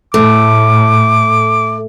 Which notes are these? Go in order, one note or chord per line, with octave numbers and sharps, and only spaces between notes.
A2 A3 D6